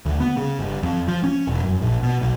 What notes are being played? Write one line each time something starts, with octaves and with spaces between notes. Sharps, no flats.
D2
B3
C#3
G1
F2
F3
C#4
E1
F#2
A#1
B2
B1